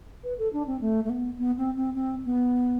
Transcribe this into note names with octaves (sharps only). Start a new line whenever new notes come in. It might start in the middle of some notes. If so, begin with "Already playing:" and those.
B4
A4
D4
C4
A3
A3
B3
B3
C4
C4
C4
B3